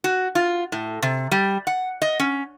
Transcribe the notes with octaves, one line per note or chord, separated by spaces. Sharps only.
F#4
F4
A2
C3
G3
F#5
D#5
C#4